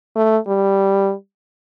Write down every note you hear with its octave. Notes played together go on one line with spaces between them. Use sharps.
A3
G3